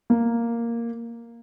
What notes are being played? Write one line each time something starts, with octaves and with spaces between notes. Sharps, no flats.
A#3